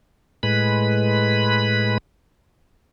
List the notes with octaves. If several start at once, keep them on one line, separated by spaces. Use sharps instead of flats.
A2 G#3 B4 B5